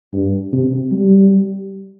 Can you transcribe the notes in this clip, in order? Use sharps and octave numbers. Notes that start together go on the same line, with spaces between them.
G2
C3
G3